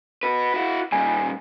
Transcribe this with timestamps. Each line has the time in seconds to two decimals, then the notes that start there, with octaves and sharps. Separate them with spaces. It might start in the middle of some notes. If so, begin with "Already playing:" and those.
0.23 F#4 B4
0.54 E4 F#4
0.92 A#2 G3 G#5